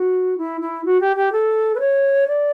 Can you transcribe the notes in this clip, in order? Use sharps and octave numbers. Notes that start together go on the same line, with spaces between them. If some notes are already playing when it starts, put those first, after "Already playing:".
Already playing: F#4
E4
E4
F#4
G4
G4
A4
B4
C#5
D5